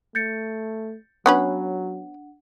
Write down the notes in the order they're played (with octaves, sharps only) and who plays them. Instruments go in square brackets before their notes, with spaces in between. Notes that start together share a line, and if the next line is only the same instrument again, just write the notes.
[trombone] A3 [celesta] G6 A6 C#7
[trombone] F#3 [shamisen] B3 C#4 B4 [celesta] D4 F#5